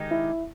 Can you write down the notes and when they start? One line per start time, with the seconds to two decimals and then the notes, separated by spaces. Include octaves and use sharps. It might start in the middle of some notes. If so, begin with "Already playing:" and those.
Already playing: D#3 G#3 D#4 G4
0.11 E4